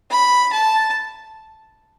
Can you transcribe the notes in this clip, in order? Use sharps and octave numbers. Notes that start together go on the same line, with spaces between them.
B5
A5